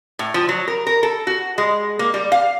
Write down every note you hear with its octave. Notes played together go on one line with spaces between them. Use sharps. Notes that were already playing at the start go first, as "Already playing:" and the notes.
A2
F3
F#3
A#4
A#4
A4
F#4
G#3
A#3
G3
F5